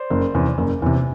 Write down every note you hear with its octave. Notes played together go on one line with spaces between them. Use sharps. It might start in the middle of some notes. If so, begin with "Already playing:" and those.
Already playing: C5 D5
F#1
E2 C3
F#1
E2 C3